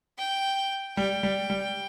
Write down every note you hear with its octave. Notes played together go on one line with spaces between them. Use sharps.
G5
G3 G5
G3
G3